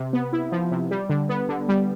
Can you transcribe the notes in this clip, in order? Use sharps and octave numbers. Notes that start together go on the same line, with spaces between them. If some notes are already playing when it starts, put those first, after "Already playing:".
Already playing: C3
B3
E4
F3
C3
G3
D3
B3
D3
G3